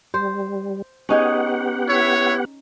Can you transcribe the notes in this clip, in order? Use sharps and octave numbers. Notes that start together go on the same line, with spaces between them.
G3 C5
B3 C#4 D#4 G4 G#4 F#5
E4 C#5